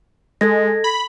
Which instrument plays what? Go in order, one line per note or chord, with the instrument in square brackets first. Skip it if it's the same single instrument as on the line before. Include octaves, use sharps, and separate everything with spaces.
[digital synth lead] G#3 [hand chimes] A4 G#6 A#6
[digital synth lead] B5